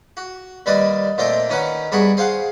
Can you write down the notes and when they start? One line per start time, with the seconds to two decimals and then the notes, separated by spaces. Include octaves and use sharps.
0.17 F#4
0.66 D#2 G3 B4 D5 D#5 D#6
1.18 A#2 A3 C4 C5 D#5 G5
1.50 D#3 C#4 D#4 B4 F#5
1.92 G2 B3 G#4 A#4 B5 C#6
2.17 G#4 C5 F5 F#5